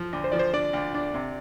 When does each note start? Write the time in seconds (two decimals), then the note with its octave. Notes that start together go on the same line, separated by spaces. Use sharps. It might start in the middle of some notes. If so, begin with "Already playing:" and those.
Already playing: F3
0.13 D2
0.24 C5
0.32 F3 D5
0.39 C5
0.53 D4 D5
0.73 D2
0.94 D4
1.14 C3